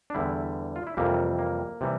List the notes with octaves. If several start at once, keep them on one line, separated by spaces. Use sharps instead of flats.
D4
E2 D3 G3 E4
F4
E4
F2 C3 E3 G3 A#3
A#3
C3 E3 G3